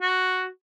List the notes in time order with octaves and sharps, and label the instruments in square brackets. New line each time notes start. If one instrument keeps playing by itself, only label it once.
[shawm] F#4